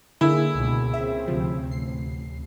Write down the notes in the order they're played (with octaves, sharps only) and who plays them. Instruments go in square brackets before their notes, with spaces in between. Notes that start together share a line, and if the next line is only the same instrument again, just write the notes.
[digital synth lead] D3 [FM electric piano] A#3 G#4 [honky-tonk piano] E4
[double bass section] C#2 B2
[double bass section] C#3 C4 [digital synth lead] E5
[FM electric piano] D2 C3 [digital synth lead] F3
[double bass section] A1 [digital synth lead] C7